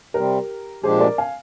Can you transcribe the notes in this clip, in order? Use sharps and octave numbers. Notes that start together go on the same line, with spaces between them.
C3 G3 C4 G4 A#4
A#2 F3 G#3 D4 G4 G#4 C5
A#4 D5
F5 G#5